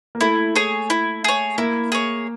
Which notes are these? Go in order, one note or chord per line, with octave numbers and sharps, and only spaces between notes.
A#3
A3 E4
G#4 C#5
E4
G#4 C#5
A#3 E4
G#4 C#5